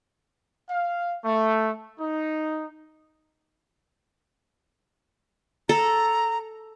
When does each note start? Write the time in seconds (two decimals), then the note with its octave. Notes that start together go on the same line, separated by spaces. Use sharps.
0.68 F5
1.24 A3
1.99 D#4
5.69 A4 A#5